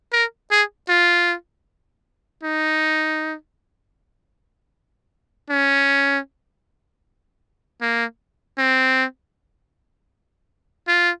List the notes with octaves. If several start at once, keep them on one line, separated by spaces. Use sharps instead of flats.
A#4
G#4
F4
D#4
C#4
A#3
C4
F4